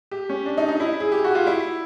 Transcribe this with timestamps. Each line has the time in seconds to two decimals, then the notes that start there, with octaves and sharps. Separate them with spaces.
0.11 G4
0.29 C#4
0.46 D4
0.58 D#4
0.68 D#4
0.80 E4
1.00 G#4
1.12 G4
1.24 F#4
1.35 F4
1.47 E4